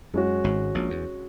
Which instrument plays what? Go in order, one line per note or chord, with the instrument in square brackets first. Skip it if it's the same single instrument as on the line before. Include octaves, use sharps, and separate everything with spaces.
[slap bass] F#2 [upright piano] G#3 C#4 F#4
[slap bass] G#1 G#2
A#1 A#2
E2